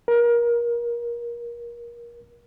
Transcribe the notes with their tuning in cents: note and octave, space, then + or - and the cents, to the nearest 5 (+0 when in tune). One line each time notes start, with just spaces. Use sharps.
A#4 +25